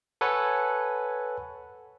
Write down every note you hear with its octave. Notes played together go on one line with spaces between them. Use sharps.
A4 B4 C#5 F#5 G#5